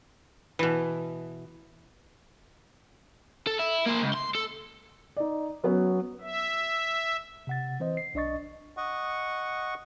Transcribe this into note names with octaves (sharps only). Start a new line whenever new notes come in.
B2 E3
A4
E4
A#3 C5
C#2
C6
A4
D#4 D5
F#3 B3 C#4 F#4
E5
C3 F#5 A6
E3 C4 C5 D#5
C7
B1 D4 D5 D#5 C#6 A6
D#5 F#5 C#6